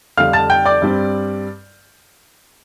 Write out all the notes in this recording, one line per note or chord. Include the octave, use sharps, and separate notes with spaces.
F2 D3 G3 D4 F5 F6
A5 A6
G5 G6
D5 D6
G2 G3 C4